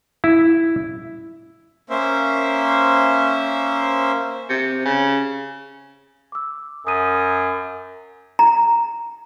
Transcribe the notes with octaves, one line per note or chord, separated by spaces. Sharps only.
E4
A#3 C#4 C5 E5
C3
C#3
D6 E6
F#2 D#6 D#7
A#5